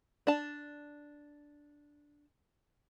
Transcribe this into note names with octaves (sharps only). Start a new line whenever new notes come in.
D4 A5